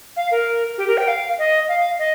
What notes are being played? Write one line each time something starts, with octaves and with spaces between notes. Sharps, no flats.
F5
A#4
G4
A#4
G5
F5
D#5
F5
D#5